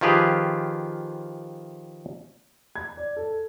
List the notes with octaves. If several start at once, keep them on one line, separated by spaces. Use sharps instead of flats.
D#3 F3 F4 G4 G#4 B4
G#6
D5
A4